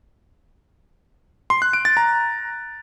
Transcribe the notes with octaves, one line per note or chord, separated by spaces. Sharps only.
C6
F#6
D7
A6
A#5